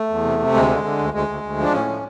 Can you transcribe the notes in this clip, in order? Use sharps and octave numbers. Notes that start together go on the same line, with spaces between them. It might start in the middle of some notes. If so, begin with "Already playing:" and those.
Already playing: A3
E2
C3
C3
D2 G#3
D3
D3
D2
D2 G#3
D2
D2
F3 D4
A2 C#4
F3